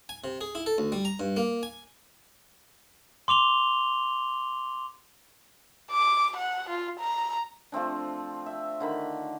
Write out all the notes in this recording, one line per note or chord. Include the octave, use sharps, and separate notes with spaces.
G#5
C3
G#4
E4
A4
D2
G3
A#5
G2
A#3
G#5
C6 D6 F7 G7
D6
F#5
F4
A#5
F3 A3 C4 D4
E5
D3 D#3 B5